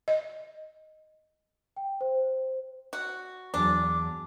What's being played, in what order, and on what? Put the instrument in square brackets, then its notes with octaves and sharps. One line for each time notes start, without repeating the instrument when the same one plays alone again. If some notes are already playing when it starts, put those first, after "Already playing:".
[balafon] D#5
[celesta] G5
C5
[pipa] F#4
[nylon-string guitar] E2 F#3 [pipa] D4